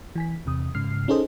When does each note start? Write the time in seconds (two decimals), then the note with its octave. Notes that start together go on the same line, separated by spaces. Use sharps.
0.16 E3 G#5 B6
0.46 E2 C3 D#6
0.75 G#2 C#3 F6 C7
1.08 C#4 D#4 G#4 A4 C5 D#5